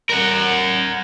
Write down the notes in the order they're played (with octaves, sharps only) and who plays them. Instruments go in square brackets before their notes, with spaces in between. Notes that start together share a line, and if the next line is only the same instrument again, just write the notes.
[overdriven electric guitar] A#4 F#5